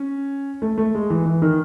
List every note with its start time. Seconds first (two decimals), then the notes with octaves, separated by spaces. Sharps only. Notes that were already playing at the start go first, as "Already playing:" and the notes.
Already playing: C#4
0.62 A3
0.78 A3
0.95 G#3
1.10 E3
1.26 E3
1.42 D#3